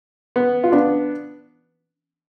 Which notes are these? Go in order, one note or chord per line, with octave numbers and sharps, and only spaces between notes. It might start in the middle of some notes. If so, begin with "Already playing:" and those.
B3
F4
B3 D4